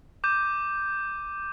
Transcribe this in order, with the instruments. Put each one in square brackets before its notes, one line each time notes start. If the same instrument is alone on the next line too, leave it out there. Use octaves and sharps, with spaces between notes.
[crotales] D6 G6 D#7